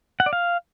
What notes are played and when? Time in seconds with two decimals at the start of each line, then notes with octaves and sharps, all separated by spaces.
0.20 F#5
0.26 D5
0.33 F5